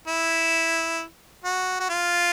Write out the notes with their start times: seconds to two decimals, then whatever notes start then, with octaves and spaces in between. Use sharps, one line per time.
0.07 E4
1.44 F#4
1.80 F#4
1.89 F4